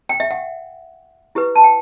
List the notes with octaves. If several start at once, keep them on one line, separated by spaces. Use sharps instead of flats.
G5
E5
F#5
E4 G4 B4
A5
G5